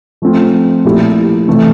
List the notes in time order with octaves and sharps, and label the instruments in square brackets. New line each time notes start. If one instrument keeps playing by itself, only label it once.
[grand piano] F3 A3 C4 F4
A#2 F3 A3 E4 G4
C3 E3 A3 E4